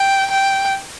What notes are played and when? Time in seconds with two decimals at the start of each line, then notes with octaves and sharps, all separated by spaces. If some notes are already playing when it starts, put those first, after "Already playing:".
Already playing: G5
0.31 G5